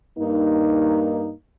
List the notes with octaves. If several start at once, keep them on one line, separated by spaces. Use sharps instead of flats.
G2 A#3 D#4